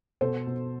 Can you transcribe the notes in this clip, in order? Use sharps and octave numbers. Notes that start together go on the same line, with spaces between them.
B2 A4 C5
B2